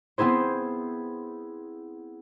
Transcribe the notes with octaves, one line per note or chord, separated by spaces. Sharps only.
B3 C4 E4 G#4 C5